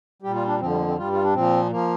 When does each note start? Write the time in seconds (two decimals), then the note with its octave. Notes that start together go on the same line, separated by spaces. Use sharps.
0.22 A#2 G3 G4
0.35 F4
0.47 D4
0.60 F2 D3 F3 C4
0.70 G3
0.78 A#3
0.88 C4
0.97 G2 G3 F4
1.12 F4
1.23 D4
1.34 A#2 F3 C4
1.71 F3 A#3